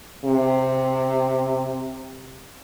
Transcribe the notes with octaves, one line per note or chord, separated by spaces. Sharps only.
C3